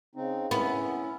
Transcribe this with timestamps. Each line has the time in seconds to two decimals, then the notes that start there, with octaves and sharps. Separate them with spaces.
0.15 C#3 C4 D#4
0.51 B3 C#4 E4